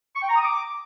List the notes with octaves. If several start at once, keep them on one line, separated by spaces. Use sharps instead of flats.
C#6
G5
A#5
D#6
D6